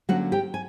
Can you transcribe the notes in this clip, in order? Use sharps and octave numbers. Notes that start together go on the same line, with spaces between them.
D3 F#3 A#3 C#4 F#4 F#5
G4 G5
G#5